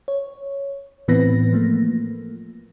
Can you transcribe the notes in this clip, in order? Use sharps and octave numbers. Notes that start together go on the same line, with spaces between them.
C#5
A2 E3 B3 C4 B4 A#6
F3 A3 A#3